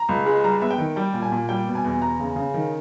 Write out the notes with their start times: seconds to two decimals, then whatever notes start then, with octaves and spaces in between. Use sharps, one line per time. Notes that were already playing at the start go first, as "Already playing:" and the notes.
Already playing: A#5
0.09 C#2
0.26 G#3
0.44 G3 A#5
0.62 B3 E5
0.71 G5
0.78 D#3
0.96 G3 G5
1.14 A#2
1.22 G#5
1.32 A#2
1.49 G3 G5
1.67 B2
1.75 G#5
1.84 E2
2.01 E2 A#5
2.19 C#3
2.36 C#3
2.54 D#3